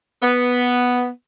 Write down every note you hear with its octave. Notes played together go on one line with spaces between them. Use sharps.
B3